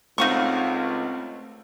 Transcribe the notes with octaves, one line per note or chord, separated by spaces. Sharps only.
C#2 A3 C4 D#4 F#4 F5 C#6